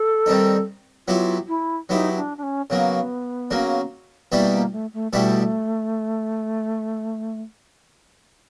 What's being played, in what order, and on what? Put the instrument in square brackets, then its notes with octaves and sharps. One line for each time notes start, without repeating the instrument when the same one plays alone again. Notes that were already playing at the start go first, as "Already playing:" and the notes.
Already playing: [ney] A4
[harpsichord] D#3 G3 C4 D#4
[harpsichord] F#3 B3 E4 G4 [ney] F4
[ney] E4
[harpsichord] F#3 B3 E4 G4 [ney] D#4
[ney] D4
D4
C#4
[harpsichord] C#3 F#3 A#3 [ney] B3
[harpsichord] C#3 F#3 A#3
[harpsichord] B2 G3 B3 E4 G4 [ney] A#3
[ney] A#3
A3
A3
[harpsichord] B2 G3 B3 E4 G4 [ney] A3